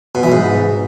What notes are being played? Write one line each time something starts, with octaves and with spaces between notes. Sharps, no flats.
B2
E3
G#2